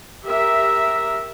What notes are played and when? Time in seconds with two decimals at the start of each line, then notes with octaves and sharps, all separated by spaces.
0.24 G4 A#4 E5